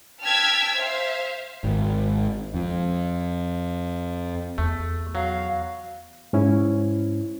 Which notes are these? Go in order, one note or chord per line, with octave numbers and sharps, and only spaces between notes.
G5 A5 E6 F6 G#6 B6
C5 E5 F5
G#1
F2
E2 A3
F#3 F5
G#2 C#4 E4